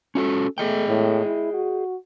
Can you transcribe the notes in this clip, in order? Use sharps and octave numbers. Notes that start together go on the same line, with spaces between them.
C#4 F#4 A4
A3 G#4 D#5 G5
A2
E4
F#4